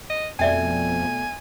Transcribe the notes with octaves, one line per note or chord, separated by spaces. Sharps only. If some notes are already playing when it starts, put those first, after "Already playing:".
D#5
F2 B2 A3 D5 E5 G5 G#5